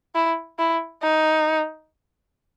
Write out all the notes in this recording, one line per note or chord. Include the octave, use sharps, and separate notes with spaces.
E4
E4
D#4